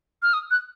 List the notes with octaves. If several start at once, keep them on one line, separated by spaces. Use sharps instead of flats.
F6
D#6
F#6